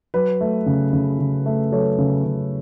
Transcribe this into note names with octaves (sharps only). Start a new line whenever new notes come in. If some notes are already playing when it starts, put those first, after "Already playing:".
F#3 B4
A3
C#3
C#3
C#3
A3
F#3 A4 C#5
C#3
C#3